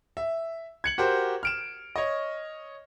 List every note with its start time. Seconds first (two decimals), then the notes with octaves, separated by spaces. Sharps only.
0.17 E5
0.84 G#6 C#7 F#7
0.98 F#4 G4 A#4 C5
1.43 F6 D7 E7
1.96 C#5 D#5